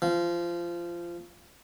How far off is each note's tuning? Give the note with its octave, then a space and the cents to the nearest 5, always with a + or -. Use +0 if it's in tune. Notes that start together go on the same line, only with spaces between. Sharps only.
F3 -20